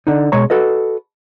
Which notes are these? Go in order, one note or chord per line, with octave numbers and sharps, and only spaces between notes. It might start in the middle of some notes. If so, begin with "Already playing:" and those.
D3 D#4
B2 G#3 C#5 A#5
F#4 A4 B4 D#5